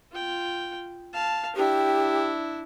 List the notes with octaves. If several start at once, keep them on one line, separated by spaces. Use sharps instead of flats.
F4 G5
F5 A5
D4 E4 G4